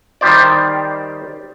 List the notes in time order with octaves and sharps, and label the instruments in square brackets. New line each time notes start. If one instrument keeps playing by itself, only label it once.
[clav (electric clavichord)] D#3 G3 G4 C5 D5